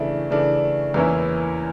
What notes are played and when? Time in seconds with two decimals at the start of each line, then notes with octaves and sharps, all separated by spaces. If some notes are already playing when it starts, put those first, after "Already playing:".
Already playing: C#3 E3 A3 D4
0.31 C#3 E3 A3 D4
0.94 E2 E3 A#3 C#4 E4